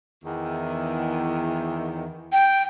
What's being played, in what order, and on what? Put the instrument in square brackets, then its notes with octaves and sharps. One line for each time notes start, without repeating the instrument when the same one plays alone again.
[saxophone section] E2 D#3
[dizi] G5